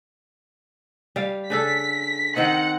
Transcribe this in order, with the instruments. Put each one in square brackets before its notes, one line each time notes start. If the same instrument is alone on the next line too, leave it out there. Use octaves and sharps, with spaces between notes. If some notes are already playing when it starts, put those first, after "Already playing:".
[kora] G3 F5
[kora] C#3 D4 A4 [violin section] B6
[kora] D#3 C4 D#5 [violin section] F#5